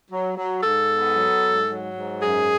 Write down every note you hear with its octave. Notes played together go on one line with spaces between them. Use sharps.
F#3
F#3
G#2 A4
B3
F#3
G#2
F#3
G#2
F#2 G#4